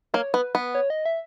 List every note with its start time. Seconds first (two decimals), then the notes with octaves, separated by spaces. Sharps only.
0.14 A#3 C#5
0.34 B3 B4
0.55 B3
0.75 C#5
0.90 D#5
1.05 E5